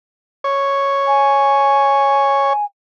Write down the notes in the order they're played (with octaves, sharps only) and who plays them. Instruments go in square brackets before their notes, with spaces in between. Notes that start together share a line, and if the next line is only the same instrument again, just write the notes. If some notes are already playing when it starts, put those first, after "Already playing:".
[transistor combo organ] C#5
[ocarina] G#5